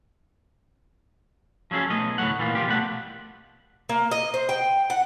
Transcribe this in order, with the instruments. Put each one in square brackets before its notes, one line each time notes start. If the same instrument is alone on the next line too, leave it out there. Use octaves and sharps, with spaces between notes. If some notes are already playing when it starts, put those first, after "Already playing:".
[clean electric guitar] F3 F#3 C#4 G#4 A4
B1 A3 D#5
D2 A2 G#3 C#5 F#5
A#2 E3 A#3 F4
F3 G3 F4 G4
B2 G3 A3 F#5
[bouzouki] A#3
D#5
C5
G5
F#5